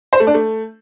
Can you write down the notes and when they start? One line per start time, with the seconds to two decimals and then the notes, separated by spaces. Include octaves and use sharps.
0.13 C5
0.20 A3
0.27 D4
0.34 A3